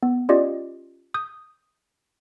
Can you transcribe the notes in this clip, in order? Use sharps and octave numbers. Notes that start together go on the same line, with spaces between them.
B3
C#4 F4 G4 D5 D#5
D#6 G6